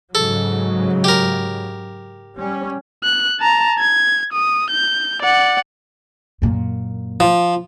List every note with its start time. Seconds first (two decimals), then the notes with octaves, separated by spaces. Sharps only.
0.15 G#2 C#3 F#3 A4
1.04 G4 A#4
2.40 G3 C#4
3.04 F#6
3.39 A5 A#5
3.79 G#6
4.33 D#6
4.70 G6
5.22 D5 F#5
6.42 F#2 A#2
7.20 F3